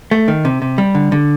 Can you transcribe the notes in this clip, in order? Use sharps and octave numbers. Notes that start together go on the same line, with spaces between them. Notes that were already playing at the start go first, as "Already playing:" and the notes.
A3
D#3
C3
C3
G3
D3
D3